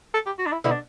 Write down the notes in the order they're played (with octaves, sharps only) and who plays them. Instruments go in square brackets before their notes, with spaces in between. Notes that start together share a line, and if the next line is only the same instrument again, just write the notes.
[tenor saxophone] A4
G4
F#4
D4
E4
[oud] B2 D3 [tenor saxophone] E4
[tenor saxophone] D4